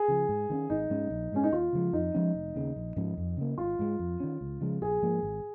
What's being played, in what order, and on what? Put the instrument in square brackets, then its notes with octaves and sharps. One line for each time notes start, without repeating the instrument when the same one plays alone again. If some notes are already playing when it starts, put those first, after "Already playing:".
Already playing: [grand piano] G#4
[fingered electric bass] C#3 F3
G#2
D#3 A#3 C#4
[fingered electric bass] G#1 [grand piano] D#4
[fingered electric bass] G#2 G#3 C#4
A#1
[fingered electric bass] G#2 G#3 [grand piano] C#4
[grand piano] D#4
[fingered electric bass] D#2 [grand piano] F4
[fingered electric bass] C#3 F3 G#3
[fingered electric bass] F2 [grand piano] D#4
[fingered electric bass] F3 G#3 C#4
F1
D#2 C#3
A#1
G#2 F3 C#4
F2
C#3 A#3
[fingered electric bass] G#1 [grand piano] F4
[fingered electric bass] G#2 G#3
F2
D#3 C#4
C#2
C#3 F3 G#3
[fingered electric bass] A#1 [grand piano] G#4
[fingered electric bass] G#2 F3 A#3
G#1